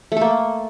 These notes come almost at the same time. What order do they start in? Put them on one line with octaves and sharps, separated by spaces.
A3 A4 A#3